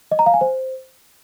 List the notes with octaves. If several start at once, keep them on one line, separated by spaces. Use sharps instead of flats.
D#5
A#5
F5
G#5
C5